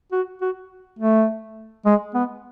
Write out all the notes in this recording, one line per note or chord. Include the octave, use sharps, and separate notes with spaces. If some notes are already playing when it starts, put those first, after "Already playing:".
F#4
F#4
A3
G#3
B3